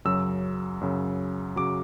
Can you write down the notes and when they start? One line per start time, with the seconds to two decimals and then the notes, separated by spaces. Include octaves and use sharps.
0.05 F#2 C#3 F#3 E6
0.81 F#2 C#3 F#3
1.56 C#3 F#3 D6